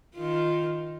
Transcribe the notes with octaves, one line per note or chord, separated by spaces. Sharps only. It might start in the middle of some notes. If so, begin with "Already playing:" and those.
D#3 F4